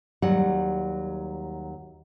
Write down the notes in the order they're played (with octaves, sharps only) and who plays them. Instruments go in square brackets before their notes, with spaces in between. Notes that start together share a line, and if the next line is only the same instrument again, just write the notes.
[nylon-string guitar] D#2 F#3 G3 F#5